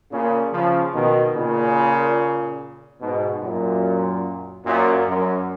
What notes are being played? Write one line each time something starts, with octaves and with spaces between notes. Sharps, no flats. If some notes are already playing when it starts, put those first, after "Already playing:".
A#2 C#3
C#3 F3
B2 D#3
A#2 C#3
G#2 B2
F#2 A#2
F#2 A#2
F#2